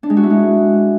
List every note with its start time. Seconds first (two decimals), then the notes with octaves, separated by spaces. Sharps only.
0.03 D4
0.10 G#3
0.17 F#4
0.23 E4
0.30 G#3